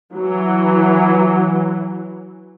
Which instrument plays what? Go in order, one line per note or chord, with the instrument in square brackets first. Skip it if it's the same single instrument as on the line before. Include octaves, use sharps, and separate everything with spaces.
[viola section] E3 F#3